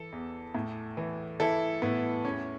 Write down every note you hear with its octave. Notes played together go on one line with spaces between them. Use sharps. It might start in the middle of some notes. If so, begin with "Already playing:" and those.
Already playing: E3 A4
E2
A2
E3
E3 E4 A4
A2 B3 E4
E2 C#4